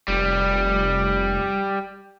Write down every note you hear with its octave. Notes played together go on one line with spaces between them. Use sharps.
F1 G3